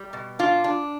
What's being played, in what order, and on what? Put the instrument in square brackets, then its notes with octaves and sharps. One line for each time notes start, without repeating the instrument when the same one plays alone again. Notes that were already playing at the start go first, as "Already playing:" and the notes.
Already playing: [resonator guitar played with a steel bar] G3
B2
D4 F4
D4